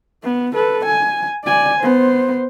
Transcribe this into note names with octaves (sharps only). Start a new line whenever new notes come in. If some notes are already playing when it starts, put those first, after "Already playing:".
B3
A4 B4
G#5
D5 G#5
B3 C5